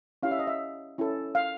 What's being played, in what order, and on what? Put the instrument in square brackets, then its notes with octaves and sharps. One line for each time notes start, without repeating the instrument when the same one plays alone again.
[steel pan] C#4 E4 G4 F5
E5
D#5
E5
C#4 E4 A4
F5